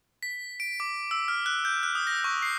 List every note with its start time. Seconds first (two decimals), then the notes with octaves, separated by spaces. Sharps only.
0.23 B6
0.60 D7
0.80 D6
1.11 E6
1.28 F6
1.46 F#6
1.65 G6
1.83 F#6
1.95 D#6
2.07 A#6
2.24 C#6
2.42 C7